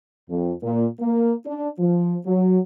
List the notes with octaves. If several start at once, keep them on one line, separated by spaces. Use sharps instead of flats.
F2
A#2
A#3
D4
F3
F#3